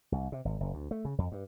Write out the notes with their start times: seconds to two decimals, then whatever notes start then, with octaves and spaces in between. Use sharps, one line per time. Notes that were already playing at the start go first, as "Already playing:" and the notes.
0.12 C2
0.32 C3
0.45 G#1
0.60 F#1
0.74 D2
0.91 A3
1.05 C#3
1.18 F2
1.32 G2